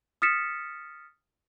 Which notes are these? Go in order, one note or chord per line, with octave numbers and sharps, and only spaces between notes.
D#6 F6 A6 B6 C#7 E7